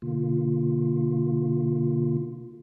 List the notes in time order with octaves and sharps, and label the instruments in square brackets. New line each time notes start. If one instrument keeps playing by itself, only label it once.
[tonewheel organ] B2 D3 A#3 F4